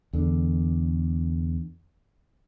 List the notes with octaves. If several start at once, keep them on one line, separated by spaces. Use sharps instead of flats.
E2 D3